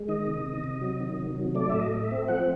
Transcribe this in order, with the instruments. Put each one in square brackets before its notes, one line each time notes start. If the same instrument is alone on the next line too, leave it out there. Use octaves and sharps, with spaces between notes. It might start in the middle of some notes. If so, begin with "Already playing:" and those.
Already playing: [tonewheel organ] G#3
D#3 D#5
C3
C3
C3
F#3
D#3
C3
F#3
A3 D5
A2 E5
D#5
A3
E5
C4
F3 F#5